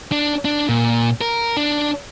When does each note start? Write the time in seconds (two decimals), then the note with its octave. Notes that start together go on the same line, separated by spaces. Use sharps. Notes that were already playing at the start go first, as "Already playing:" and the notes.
0.12 D4
0.45 D4
0.69 A#2
1.21 A#4
1.57 D4